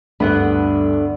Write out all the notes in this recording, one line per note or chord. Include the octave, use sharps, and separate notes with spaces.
D2 G2 D3 B3 F#5 B5